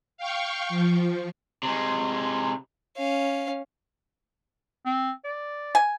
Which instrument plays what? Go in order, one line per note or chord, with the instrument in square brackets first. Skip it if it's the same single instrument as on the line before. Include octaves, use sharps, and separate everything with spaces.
[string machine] F5 G5 C#6
F3
[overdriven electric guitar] C3 G#3
[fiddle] C#4 F5
[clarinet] C4
D5
[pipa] G#5